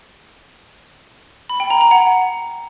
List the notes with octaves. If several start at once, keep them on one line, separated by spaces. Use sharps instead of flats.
B5
G5
A#5
A#5
F#5